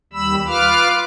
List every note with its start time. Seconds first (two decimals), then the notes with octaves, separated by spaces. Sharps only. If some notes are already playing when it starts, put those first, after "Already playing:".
0.13 D#2 G3 B5 E6
0.47 F4 B4 F5 D6 F6